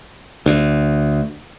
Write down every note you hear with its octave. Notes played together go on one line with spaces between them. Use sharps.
D2